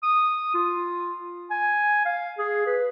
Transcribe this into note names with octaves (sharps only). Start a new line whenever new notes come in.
D#6
F4
G#5
F5
G#4
B4